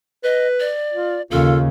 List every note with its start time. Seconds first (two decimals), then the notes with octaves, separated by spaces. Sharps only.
0.24 B4 D#5
0.60 D5
0.94 F4
1.31 D#2 C#3 F4 A4